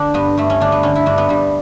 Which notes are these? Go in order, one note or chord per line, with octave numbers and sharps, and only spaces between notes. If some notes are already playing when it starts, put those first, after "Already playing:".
Already playing: D3 D4
G2 B3
G2 A3
C#4
D3 D4
B3
D3 C#4
E4
G2 D4
B3
G2 G3